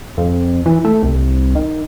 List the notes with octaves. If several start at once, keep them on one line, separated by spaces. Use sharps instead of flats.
F2
E3
A3
C2
D#3